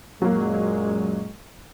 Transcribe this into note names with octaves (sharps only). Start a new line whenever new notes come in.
F#2 A#2 F#3 G#3 A#3